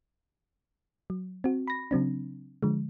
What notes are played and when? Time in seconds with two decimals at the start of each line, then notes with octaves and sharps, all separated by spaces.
1.10 F#3
1.44 C4 F#4
1.68 B5 A#6
1.91 C#3 F#3 C4 D4
2.63 D3 F3 G#3